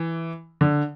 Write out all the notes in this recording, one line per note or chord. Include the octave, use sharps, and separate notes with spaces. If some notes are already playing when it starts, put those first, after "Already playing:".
Already playing: E3
D3